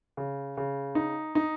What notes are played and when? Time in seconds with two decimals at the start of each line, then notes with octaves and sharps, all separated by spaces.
0.17 C#3
0.57 C#3
0.95 D#4
1.35 D#4